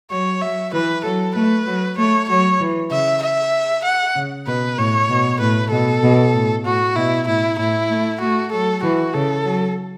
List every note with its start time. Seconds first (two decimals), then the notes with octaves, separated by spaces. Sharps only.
0.11 F#3 C#5
0.42 F#3 E5
0.73 E3 B4
1.04 F#3 A4
1.36 A3 B4
1.67 F#3
1.98 A3 C#5
2.28 F#3 C#5
2.61 E3
2.91 C#3 E5
3.23 E5
3.85 F#5
4.16 C#3
4.47 B2 B4
4.78 A2 C#5
5.10 B2
5.40 A2 B4
5.71 B2 A4
6.03 B2
6.34 A2
6.65 A2 F#4
6.96 B2 E4
7.27 A2 E4
7.58 A2 E4
7.90 A3
8.21 A3 F#4
8.52 F#3 A4
8.83 E3 F#4
9.14 C#3 A4
9.45 F#3